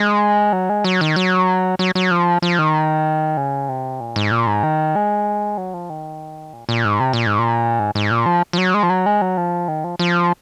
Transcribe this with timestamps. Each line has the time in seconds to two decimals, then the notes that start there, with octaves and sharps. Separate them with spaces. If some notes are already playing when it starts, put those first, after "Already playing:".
Already playing: G#3
0.53 F#3
0.69 G#3
0.84 F#3
1.01 D#3
1.16 F#3
1.79 F#3
1.95 F#3
2.11 F3
2.42 F3
2.59 D#3
3.37 C#3
3.69 C3
4.00 A#2
4.16 G#2
4.31 A#2
4.47 G#2
4.63 D#3
4.95 G#3
5.58 F#3
5.74 F3
5.90 D#3
6.53 A#2
6.69 A#2
6.85 G#2
7.00 C3
7.13 A#2
7.26 G#2
7.38 A#2
7.79 G#2
7.95 G#2
8.11 A#2
8.26 F3
8.53 F3
8.58 F#3
8.74 G#3
8.83 F3
8.89 F#3
9.06 G#3
9.21 F#3
9.37 F3
9.68 D#3
9.84 F3
9.99 F3